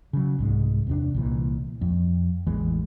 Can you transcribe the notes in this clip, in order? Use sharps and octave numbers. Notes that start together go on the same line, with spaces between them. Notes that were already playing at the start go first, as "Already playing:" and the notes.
C#3 F#3
C2 G#2 G#3
E2 C3 D4
C2 A#2 E3
F2
A1 E2 E3 G#3